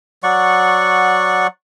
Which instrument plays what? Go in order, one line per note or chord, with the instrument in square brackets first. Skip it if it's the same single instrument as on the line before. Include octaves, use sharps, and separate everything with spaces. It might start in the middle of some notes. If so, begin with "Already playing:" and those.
[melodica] F#3 D5 F#5 C#6